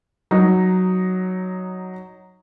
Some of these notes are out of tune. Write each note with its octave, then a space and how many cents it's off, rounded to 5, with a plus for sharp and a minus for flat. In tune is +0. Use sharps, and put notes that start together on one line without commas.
F#3 +0 D#4 +0